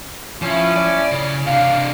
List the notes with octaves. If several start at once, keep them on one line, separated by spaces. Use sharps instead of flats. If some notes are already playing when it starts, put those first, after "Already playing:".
F3 C#4 E4
D5
C#3
C3 D4 F5